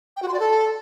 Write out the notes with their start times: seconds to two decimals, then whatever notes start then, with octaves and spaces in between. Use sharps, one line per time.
0.17 G5
0.22 F#4
0.28 C6
0.34 D5
0.40 A4